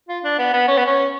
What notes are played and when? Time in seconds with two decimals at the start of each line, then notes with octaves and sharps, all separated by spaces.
0.09 F4
0.24 D4
0.38 B3
0.53 B3
0.68 C#4
0.77 B3
0.86 C#4